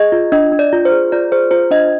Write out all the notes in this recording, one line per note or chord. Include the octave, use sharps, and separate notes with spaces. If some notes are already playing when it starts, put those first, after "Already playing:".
Already playing: G#4 D#5
F4
D4 D#5
D4
D5
F4
C5
G#4
F4 D5
G#4 C5
F4 C5
D4 D#5